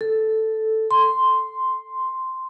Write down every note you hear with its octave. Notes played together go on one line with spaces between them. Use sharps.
A4
C6